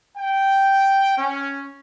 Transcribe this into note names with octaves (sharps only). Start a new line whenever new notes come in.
G5
C#4